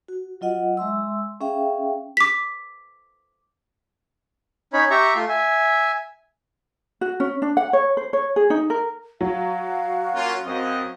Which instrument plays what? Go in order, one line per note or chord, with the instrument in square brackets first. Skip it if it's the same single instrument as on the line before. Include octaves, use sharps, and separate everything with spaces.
[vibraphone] F#4
F#3 F4 D#5 F#5
G#3 E5 C6 E6
C#4 G#4 E5 F5 G5
[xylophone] D6 B6
[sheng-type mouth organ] C#4 D#4 C#5 B5
G4 E5 A#5 C#6
A3 F4 C6
E5 G#5
[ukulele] F#4
C#4
D4
F#5
C#5
C5
C#5
G#4
D#4
A#4
[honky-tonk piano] F#3 [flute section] F#4 F5
[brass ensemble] A#3 C#4 F4
F#2 C4 D#5